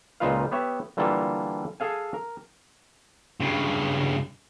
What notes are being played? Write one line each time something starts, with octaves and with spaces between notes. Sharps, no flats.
C#2 A#2 D#4 F4 B4 F5
B3 G4 C#5 E5
D3 E3 G3 A#3 F4 A4
G#4 A4 F5 G#5
A#4
G2 C#3